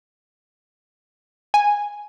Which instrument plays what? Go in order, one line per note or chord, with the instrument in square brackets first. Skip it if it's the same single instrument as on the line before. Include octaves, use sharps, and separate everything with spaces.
[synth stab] G#5